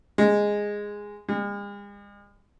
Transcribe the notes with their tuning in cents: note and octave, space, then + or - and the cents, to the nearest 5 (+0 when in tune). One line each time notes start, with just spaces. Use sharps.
G#3 -10
G#3 -45